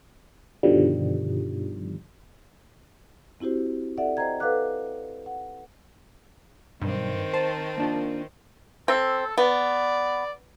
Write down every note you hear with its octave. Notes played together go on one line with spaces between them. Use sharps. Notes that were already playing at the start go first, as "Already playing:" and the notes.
G2 B2 D3 D#3 F3 G3
C4 E4 F#4 G4 C5
A4 D5 E5 F#5
C5 D#5 G5 A#5 G#6
A4 B4 F5 F#5 D6 F#6
F#5
B1 G2 D#3 C4
C5 A5
A#3 D4 F4
C4 A4
B3 D5